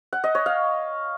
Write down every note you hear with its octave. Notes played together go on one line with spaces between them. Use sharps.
F#5
D#5
C#5
F5